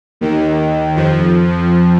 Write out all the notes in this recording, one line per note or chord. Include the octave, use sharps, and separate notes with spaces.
D#2 D#3
F2 F3